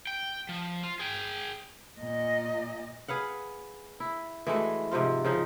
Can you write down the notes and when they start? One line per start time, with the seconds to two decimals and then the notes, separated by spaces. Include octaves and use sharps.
0.07 G5
0.49 F3
0.83 F4
0.99 G#4 G5
2.00 A#2 D#5
3.08 G#4 B4 F5 F#5
4.00 E4
4.47 E3 G#3 A3 F#4
4.91 G#2 C3 F3 F4
5.24 C#3 F3 D#4